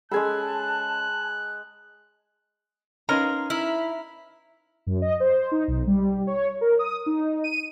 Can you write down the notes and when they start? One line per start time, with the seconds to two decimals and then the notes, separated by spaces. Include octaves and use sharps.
0.11 G#3 C#4 G#4 A4 G#5 A5 B5 F#6
3.09 C#4 D#4 A#4 B4 F5 C6
3.50 E4 E5 A#5 F6
4.87 F#2
5.02 D#5
5.20 C5
5.52 D#4
5.68 B1
5.87 G3
6.27 C#5
6.61 A#4
6.79 D#6
7.06 D#4
7.44 D#7